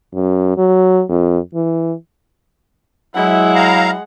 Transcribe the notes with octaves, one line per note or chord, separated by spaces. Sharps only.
F#2
F#3
F2
E3
F#3 G#3 E4 F#5
F5 A#5